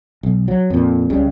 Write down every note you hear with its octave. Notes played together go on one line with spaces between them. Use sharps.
B1
F#3
F2 A#2
C#2 C#3 G3